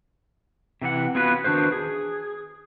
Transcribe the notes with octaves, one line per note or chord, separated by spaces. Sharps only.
C3 E3 D4 F#5
B3 C#4 F4 F#4 B4
D#3 D4 F#4 B4 C5
G#4